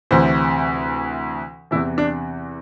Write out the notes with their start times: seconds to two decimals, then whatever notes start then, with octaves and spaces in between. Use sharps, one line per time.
0.11 D2 C3 E3 C5
1.71 E2 C3 E3 E4
1.98 D4